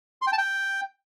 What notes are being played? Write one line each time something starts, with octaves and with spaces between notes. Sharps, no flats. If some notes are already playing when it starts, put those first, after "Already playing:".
C6
G5
A5
G5